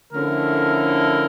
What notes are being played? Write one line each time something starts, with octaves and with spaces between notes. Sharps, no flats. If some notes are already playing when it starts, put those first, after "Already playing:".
D3 F3 A3 C#4 E4 A#4